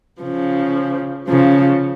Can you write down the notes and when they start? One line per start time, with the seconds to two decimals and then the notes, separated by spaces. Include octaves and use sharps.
0.22 C#3 F3
1.28 C#3 F3